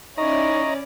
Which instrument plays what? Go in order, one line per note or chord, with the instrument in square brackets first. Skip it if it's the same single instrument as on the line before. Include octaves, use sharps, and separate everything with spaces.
[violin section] C#4 E4 D5 [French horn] D#4 [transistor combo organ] D#5 A#5 [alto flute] C#6